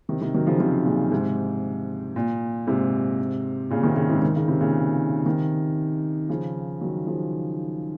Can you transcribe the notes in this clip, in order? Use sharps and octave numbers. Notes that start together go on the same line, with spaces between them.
C3 D#3
C3 D#3
D#3 F#3
C#3 F3
C3 D#3
A#2 C#3
G#2 C3
A#2
G#2 C3
A#2 C#3
C3 D#3
A#2 C#3
G#2 C3
D#3
C#3
C3
A#2 C#3
C3 D#3
C#3 F3
D#3 F#3
C#3 F3